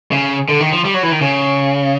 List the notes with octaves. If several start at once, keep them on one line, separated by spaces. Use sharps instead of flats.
C#3
D3
D#3
F3
G3
F#3
E3
D#3
C#3